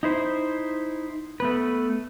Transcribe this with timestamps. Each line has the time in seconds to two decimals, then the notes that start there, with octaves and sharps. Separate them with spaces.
0.03 D#4 E4 C5
1.40 A3 B3 B4